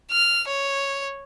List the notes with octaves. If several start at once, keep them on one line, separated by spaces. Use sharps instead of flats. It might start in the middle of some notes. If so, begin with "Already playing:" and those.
F6
C#5